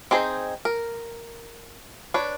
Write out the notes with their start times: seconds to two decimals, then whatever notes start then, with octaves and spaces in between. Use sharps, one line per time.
0.11 C4 D#4 G#4 C5
0.65 A#4
2.14 D4 B4 C#5